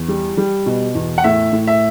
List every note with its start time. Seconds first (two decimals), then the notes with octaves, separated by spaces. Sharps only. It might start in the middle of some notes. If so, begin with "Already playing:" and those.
Already playing: E2
0.08 G3
0.37 G3
0.66 B2
0.95 E2
1.18 F#5
1.24 A2 E5
1.53 A2
1.67 E5